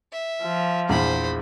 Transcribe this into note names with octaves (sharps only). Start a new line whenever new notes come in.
E5
F3
A#1 E2 C5 B5